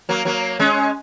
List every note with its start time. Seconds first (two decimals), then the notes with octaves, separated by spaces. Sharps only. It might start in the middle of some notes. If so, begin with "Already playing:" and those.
0.09 F#3 A#3
0.25 F#3 A#3
0.59 G#3 C#4